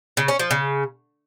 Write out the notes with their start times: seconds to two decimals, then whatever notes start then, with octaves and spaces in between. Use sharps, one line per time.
0.17 C#3
0.28 C#4
0.39 F3
0.51 C#3